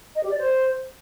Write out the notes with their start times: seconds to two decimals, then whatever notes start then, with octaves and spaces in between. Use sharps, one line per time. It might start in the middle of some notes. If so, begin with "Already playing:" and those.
0.15 D#5
0.23 G4
0.30 D5
0.38 C5